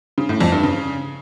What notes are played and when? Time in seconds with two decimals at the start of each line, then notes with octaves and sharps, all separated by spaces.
0.18 C#3
0.29 A2
0.40 F2
0.52 G2
0.63 C#3